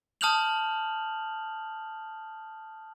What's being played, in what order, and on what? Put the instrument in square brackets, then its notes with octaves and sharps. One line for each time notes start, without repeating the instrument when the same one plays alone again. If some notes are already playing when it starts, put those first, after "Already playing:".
[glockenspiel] A5 D#6 F6 G6 F7 F#7